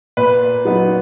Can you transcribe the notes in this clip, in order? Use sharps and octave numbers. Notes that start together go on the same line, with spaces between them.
A#2 B4
F#3 B3 D#4